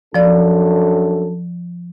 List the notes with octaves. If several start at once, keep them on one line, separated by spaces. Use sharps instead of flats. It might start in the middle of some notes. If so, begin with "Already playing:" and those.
F#2 F3 D4 A4 D5